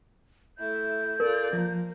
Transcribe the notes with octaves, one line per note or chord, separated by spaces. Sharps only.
A3 E4 G6
F4 A4 A#4 D5
F3 A#3